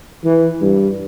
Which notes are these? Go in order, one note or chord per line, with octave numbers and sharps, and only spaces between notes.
E3
G2